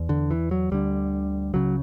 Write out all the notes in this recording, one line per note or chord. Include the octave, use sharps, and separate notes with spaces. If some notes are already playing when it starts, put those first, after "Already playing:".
Already playing: E2
D3
E3
F#3
D2 D3 G3
C#2 C#3 F#3